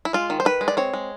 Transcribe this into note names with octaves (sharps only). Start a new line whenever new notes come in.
E4
G#3 F4
D#3
C5
D#3 B4
G#3
D5
C4 C#5
G#3